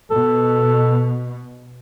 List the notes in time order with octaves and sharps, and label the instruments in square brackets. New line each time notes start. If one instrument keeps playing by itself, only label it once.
[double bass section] B2 [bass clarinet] A4